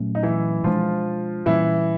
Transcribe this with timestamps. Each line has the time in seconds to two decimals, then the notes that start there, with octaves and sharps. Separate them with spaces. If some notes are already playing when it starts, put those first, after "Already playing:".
Already playing: A#2 F#3 A3 C#4
0.15 D#4
0.23 E3 E4
0.64 B2 F3 G#3 B3 D4 F4
1.46 A#2 E3 G3 A#3 C#4 E4